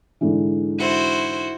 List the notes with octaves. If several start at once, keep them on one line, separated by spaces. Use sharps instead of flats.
G#2 D3 E3
E4 F#4 C5